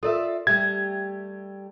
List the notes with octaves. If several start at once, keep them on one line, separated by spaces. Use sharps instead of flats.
F4 A4 A#4 D5 E5
G3 A3 G4 E5 G#6